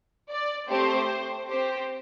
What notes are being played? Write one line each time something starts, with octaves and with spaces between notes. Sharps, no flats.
D5
A3 C4 G4 C5
C4 G4 C5